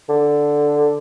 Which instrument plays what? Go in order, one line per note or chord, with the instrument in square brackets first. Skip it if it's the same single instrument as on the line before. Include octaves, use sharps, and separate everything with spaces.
[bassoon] D3